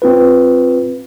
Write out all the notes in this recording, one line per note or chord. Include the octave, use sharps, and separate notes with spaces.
C4 F4 B4